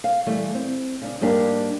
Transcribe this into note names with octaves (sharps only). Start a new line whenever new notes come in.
F5
E3 G3 A3
C4
C#3 D4
G#2 G3 A#3 D4 G4